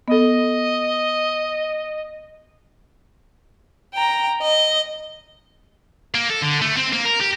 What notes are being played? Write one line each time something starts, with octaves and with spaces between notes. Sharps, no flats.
B3 A4 D#5
G5 A#5
D#5
A#3
A4
D3
A3
C4
A#3
A#4
G4